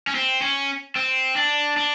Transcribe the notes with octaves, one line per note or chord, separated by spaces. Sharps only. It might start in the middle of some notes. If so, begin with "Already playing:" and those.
C#4
C4
C#4
C4
D4
D4